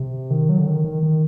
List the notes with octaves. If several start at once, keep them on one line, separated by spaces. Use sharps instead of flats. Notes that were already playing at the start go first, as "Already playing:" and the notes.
Already playing: C3
D#3
F#3
D3
D#3
D#3
D#3